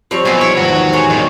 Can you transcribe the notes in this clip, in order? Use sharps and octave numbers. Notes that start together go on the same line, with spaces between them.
F3 G3 C4 C#5
B1 B2 C4 G#5
E4 C#5 E5 E6
G#1 E2 F#3 F#4
A1 G#4 C5 C#5
A#2 D#3 F#3 F5